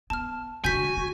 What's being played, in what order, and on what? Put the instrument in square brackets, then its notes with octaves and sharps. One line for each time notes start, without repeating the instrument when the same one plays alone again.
[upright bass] B3 [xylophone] A5 F6
[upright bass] D3 G#3 [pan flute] F#4 [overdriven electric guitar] G#5 [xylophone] G6 B6
[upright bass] G#3